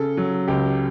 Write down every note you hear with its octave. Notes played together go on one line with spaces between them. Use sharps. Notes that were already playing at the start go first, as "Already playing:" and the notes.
Already playing: C#3 A4
F#3
C#2 G4